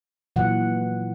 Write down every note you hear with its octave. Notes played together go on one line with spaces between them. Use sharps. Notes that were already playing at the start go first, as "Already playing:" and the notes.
A#2 E3 F#3 F#5